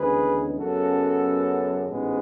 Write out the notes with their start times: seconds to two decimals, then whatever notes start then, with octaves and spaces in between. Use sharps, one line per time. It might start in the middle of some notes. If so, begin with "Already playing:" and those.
Already playing: D2 C#3 E3 G#3 B3 G#4 B4
0.58 F#2 C#3 F#3 B3 F#4 A4
1.88 A1 G#2 G#3 B3